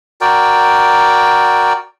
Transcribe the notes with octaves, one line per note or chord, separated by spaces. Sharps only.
F#4 A#4 D5 G5